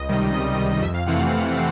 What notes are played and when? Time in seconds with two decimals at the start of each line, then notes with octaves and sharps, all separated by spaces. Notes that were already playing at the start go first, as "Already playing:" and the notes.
Already playing: C#2 D#5
0.09 C3 D#3 G3
0.33 C#2 D#5
0.58 C3 D#3 G3
0.82 F2 E5
0.94 F5
1.06 C3 E3 A3 C4 F#5
1.19 F5
1.31 F2
1.56 C4